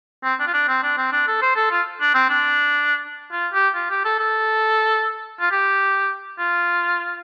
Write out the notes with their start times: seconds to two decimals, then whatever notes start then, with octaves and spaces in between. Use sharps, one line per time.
0.24 C4
0.39 D4
0.47 F4
0.54 D4
0.68 C4
0.83 D4
0.97 C4
1.12 D4
1.27 A4
1.42 C5
1.56 A4
1.71 F4
2.01 D4
2.14 C4
2.29 D4
3.32 F4
3.54 G4
3.75 F4
3.90 G4
4.05 A4
4.19 A4
5.40 F4
5.51 G4
6.39 F4